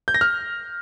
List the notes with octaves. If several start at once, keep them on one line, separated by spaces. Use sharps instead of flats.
G6
A#6
F6